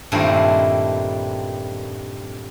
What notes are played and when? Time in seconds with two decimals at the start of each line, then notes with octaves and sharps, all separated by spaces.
0.12 G2 A#2 D#3 A3 C4 E4